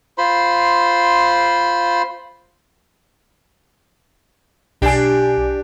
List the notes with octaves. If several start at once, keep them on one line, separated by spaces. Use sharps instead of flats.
F4 C5 B5 C6
B1 D4 G4 G#5